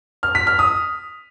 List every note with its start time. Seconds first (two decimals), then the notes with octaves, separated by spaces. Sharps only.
0.23 F6
0.35 B6
0.47 F6
0.59 D#6